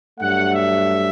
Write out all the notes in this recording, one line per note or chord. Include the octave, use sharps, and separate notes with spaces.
G2 F#3 A3 F#5
E5